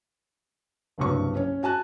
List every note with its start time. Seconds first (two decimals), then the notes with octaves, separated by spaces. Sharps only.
0.98 F#1 C2 G2 F#3 C#6
1.35 C#4 C#5
1.63 F#4 G#5 A5 F#6